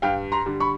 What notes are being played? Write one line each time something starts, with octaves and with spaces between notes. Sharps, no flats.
G2 F5 G5
A#5 C6
D3 G3
B5 C#6